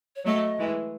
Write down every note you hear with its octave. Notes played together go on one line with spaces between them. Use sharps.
C#5
F#3 A3 D#5
E3 G#3